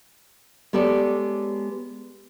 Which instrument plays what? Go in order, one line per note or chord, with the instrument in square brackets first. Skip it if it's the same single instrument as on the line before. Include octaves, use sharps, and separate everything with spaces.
[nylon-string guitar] G#3 B3 G4 A4 C#5 D5